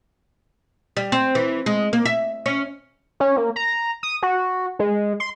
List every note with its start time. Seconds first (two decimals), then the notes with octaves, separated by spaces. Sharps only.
0.97 G3
1.12 C4
1.35 E3
1.66 G#3
1.93 A#3
2.05 E5
2.46 C#4
3.20 C#4
3.37 A#3
3.56 A#5
4.03 D#6
4.22 F#4
4.79 G#3
5.20 C6